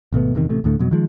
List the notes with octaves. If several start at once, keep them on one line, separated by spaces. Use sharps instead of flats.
G#1 B2 A3 B3
D#1 E2 C3 D#3
A1 C3 A3
D2 A2 D3 A3
F2 B2 F#3
D#3 F3 G#3